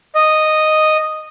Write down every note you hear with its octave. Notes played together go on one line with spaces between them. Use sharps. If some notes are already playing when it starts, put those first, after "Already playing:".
D#5